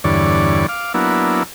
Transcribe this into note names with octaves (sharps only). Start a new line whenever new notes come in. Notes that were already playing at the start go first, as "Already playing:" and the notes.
E2 G2 D3 C#5 D5
F5 D6
F#3 A#3 B3 D4 E4